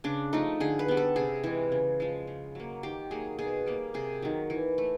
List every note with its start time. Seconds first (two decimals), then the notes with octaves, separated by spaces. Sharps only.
0.04 C#3 D4
0.33 F3 A3 D#4
0.60 D3 G#4
0.79 B4
0.88 G3 B3
0.97 A4
1.16 C3 G#4
1.44 E3 G#3
1.72 C#3
2.00 F3 G#3
2.27 C#3
2.55 F#3 A#3
2.83 D#3 G4
3.11 F#3 A#3 G#4
3.39 B2 G#4
3.66 G3 A#3
3.94 C3 G#4
4.22 D#3 F#3
4.50 E3
4.78 A3